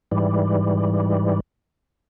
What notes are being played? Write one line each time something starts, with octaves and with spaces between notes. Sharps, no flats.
G#2 E3 G3